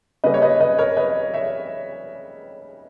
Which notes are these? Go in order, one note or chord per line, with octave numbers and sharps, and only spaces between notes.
C#3 G3 A#3 B4 D#5
C#5
B4 D#5
B4 D#5
A#4 C#5
B4 D#5
C#5 E5